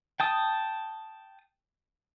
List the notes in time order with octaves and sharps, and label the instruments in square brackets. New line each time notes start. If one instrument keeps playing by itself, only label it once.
[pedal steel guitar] G5 A5 D#6